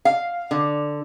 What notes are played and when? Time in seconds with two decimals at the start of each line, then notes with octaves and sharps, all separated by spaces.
0.05 F5
0.51 D3